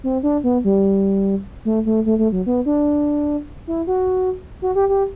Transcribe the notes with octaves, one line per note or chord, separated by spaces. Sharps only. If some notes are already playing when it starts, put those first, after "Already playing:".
C4
D4
B3
G3
A3
A3
A3
A3
F#3
B3
D4
E4
F#4
F#4
G4
G4